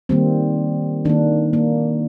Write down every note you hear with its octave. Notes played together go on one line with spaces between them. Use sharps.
D#3 G3 A#3 C4
D#3 A#3 D4
A#3